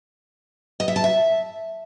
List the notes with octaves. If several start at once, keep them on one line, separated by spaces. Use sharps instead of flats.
D#5
E5
A5
E5